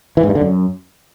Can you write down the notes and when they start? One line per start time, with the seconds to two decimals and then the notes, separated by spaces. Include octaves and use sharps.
0.17 E3
0.23 G#2
0.29 G2
0.35 D3
0.41 F#2